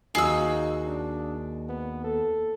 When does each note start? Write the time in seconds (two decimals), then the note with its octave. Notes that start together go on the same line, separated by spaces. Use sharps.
0.15 D#2 D#4 F#4 G#4 F5 E6
0.87 D4
1.69 B3
2.04 A4